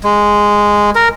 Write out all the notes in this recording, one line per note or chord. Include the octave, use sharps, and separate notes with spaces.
G#3
A#4